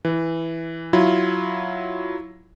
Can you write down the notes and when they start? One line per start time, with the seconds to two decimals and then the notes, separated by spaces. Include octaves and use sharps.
0.05 E3
0.93 F#3 E4 F4